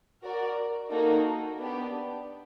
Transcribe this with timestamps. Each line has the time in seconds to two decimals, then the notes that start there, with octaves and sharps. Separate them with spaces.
0.22 F#4 A#4 D5
0.90 A#3 D#4 F#4 A4
1.59 B3 D4 G4